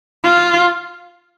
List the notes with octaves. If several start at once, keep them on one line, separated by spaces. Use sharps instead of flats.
F4